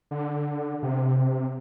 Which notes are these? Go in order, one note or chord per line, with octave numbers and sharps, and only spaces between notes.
D3
C3